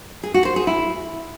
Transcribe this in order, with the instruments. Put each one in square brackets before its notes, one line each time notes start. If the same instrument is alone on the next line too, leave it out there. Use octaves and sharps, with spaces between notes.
[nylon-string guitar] G#4
F#4
C5
G#4
E4